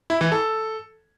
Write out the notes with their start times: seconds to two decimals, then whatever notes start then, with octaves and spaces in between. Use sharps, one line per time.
0.10 E4
0.21 E3
0.32 A4